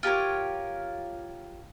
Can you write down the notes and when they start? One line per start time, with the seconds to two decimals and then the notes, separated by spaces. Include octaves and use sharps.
0.03 F4 G4 A#4 C#5